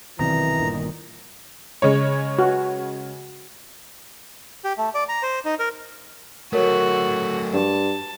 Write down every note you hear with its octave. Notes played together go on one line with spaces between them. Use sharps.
B1 C3 D#3 E3 D5 A#5
G1 A#2
C#3 G#3 C#5
F#4
G4
A3
D5
A#5
C5
D#4
A#4
F#3 A3 F#4 A#4 C#5
G2 A5